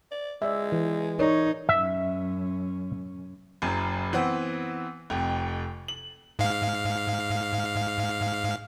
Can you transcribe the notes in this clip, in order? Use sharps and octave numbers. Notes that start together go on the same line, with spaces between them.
D5
G#3 D5 E5
E3
D#4 A#4 C#5 D5
F#2 C#4 E5
F#1 F#2
E3 B3 C4
F1 F2
F#7
G#2 F5